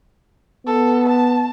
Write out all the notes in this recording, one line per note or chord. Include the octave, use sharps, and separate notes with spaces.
B3 A4
A5